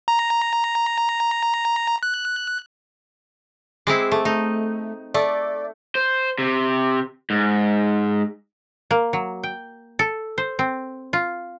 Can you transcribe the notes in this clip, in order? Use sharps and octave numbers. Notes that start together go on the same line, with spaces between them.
A#5
F#6
G#3 C4 E4 D6
A3
A3 D#4
A3 D5
C5
C3
G#2
A#3
F#3
G5
A4
C5
C4
F4